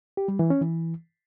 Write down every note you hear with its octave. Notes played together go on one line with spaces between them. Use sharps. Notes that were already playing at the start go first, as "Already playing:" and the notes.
G4
G3
E3
C#4
E3